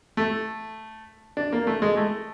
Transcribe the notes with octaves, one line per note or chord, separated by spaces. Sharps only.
A3
D4
A#3
A3
G#3
A3